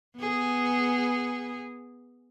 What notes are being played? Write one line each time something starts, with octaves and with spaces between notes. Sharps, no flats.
B3 G#4